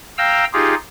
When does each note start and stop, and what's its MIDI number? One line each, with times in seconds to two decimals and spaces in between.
0.18 0.45 77
0.18 0.45 79
0.18 0.45 82
0.18 0.45 88
0.53 0.75 63
0.53 0.75 65
0.53 0.75 67
0.53 0.75 68